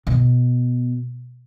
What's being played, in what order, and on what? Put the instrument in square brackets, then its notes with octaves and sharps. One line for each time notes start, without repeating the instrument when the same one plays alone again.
[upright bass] B2